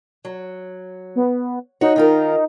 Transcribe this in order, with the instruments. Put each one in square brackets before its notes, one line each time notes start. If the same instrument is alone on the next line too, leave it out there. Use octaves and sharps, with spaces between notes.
[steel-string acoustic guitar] F#3
[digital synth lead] B3
[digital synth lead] D#4 [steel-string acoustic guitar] F#4 C#5
[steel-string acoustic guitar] D#3 F4 A#4